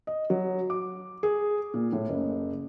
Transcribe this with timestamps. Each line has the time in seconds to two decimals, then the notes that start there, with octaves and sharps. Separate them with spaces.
0.07 D#5
0.30 F#3
0.70 D6
1.23 G#4
1.74 A#2
1.93 A2
2.09 F#1